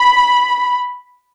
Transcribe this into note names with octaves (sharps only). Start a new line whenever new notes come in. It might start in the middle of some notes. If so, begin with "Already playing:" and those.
Already playing: B5